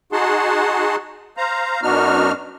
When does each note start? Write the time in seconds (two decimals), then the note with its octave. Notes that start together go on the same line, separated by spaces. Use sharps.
0.12 D#4 F#4 G#4 F#5 A5 C6
1.37 C5 F5 A#5
1.83 F#2 B3 D4 D#4 F#4 F6